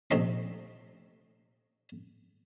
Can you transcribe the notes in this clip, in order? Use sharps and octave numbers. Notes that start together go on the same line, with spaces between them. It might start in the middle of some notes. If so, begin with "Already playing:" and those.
A#1 C3 A3 D#5 C6